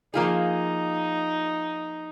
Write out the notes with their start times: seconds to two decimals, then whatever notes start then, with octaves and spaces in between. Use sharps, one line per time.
0.14 F3 A#3 D#4 F4 G#4